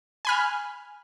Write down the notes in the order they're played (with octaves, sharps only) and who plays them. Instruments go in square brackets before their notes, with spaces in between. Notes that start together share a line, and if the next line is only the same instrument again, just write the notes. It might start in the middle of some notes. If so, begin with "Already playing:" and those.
[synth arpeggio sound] G#5 B5 F6